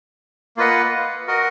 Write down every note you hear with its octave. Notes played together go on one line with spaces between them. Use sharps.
A#3 F4 B4 D#5 F#5
F#4 A#4 D#5 F#5